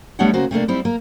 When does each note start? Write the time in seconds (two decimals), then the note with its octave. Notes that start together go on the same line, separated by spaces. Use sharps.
0.19 G3 A3 B3 D4 C#5 F#5
0.34 C#3 A#3 F#4 C5
0.51 C3 A3 A#3 D4
0.68 G3 C4 D#4 E4
0.85 A#3 A#4